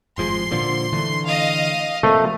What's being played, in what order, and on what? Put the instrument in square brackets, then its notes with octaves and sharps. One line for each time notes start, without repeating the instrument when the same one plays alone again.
[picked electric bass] G#1 F3 G#3 [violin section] C6
[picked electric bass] A#2 D3 F3
D3 E3 A3
[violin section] D#5 F5
[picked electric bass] C3 F3 A#3 [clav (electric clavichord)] A3